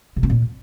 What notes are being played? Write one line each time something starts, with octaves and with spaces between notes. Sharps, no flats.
C3
C4
A#2